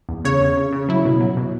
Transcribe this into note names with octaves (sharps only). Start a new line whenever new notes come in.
E2
C#3 C#5
C#3
C#3
C#3
F#3 E4
B2
F#3
B2